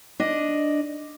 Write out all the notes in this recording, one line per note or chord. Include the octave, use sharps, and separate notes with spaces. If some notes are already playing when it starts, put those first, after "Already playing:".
D4 D#5